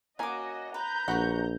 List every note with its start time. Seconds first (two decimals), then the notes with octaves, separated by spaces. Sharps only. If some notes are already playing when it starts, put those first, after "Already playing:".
0.19 A#3 C#4 F#4 D#5 G#5 D6
0.74 B4 A#5 G6
1.08 A#1 F#4 B4 F#5 C#6